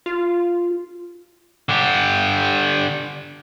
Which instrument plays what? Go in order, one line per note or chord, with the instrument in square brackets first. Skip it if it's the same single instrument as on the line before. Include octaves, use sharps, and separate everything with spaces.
[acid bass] F4
[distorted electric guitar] D3 G4